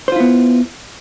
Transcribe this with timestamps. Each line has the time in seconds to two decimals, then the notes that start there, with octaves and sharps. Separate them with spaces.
0.08 C5
0.12 F4
0.16 E4
0.20 B3